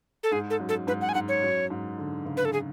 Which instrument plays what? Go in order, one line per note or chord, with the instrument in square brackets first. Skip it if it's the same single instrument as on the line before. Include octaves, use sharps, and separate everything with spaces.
[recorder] A4
[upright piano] G#2 [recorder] G#4
[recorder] A4
[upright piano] F#2
[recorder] A4
[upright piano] G#2 [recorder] B4
[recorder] F#5
G#5
[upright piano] G#2 [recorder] F#5
[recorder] C#5
[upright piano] F#2
G#2
D3
C#3
[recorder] B4
A4
G#4